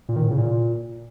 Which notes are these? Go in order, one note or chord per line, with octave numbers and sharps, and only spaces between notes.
A#2
D#3
A2
C#3
A#2